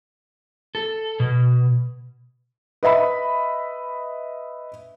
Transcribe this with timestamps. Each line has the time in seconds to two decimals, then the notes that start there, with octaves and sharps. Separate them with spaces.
0.75 A4
1.20 B2
2.83 B4 D#5 E5 B5